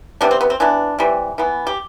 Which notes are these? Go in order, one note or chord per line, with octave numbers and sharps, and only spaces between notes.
C3 G3 B3 D4
C4
B3
C4
E3 B3 D4
C3 E3 G3
E3 B3
G4